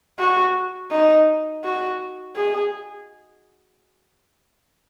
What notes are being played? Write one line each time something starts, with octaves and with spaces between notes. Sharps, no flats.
F#4
D#4
F#4
G#4